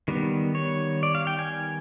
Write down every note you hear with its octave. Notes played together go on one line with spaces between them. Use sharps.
D#3 G3 B3
C#5
D5
F5
G5
G#5